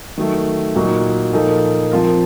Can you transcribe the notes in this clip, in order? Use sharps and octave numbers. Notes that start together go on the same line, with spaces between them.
D#3 F#3 A3
A#2 F#3 A#3 D#4 F#4
A#2 F3 A#3 D#4 A4
F3 C4 F4 A#4